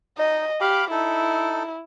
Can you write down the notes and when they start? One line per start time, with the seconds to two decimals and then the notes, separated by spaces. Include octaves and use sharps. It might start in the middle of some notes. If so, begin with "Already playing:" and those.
0.18 D#4 D#5
0.61 G4 F5 B5 D6
0.91 D#4 E4 A4